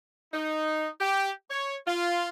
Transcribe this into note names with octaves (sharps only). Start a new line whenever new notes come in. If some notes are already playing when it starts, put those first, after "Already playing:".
D#4
G4
C#5
F4